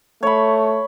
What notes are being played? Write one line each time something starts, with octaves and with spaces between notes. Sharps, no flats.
A3 C#5 B5